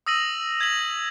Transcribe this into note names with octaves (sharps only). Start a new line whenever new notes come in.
D#6 E6 A#6 D#7 F#7
G#6 B6 F#7